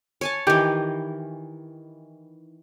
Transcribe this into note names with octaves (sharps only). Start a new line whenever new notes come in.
C#5 G#5 A5
D#3 E3 G4